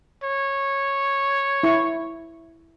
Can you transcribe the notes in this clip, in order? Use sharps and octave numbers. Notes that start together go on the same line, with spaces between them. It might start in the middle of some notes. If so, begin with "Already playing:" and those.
C#5
E4 C#6